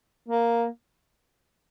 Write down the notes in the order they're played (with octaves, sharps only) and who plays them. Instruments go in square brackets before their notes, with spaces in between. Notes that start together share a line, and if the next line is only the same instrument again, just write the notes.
[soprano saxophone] A#3